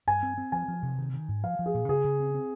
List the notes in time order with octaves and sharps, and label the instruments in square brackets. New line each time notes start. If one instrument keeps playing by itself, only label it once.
[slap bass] G2 [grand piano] G#5
[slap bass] C4
C4
[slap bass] F3 [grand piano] G#5
[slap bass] F3
C3
D#3
D#3
G#2
[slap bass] F3 [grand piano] F5
[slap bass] F3
[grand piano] G#4
[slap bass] A#2
[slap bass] C#3 [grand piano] G#4
[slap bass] C#3
C4
C4